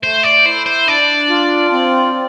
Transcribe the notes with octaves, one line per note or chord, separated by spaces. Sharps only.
A3 C5
D5
E4 C5
C5
D4 D5
F4
C4